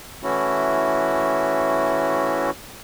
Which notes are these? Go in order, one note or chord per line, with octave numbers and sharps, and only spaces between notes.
E3 A3 C#4 E4 F#4